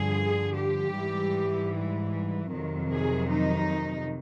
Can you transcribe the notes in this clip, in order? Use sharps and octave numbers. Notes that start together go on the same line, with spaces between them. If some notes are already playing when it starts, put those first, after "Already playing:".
Already playing: G2 D3 F3 G#4
G4
G#2 E3 G3
F2 C3 D#3 F#3
G#4
D#4